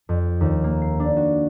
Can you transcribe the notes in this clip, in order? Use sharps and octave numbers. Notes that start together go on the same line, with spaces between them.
F2
D#2
A#3
C7
D4
F#4